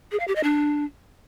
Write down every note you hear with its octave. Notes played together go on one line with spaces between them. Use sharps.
G#4
F5
G4
D#5
D4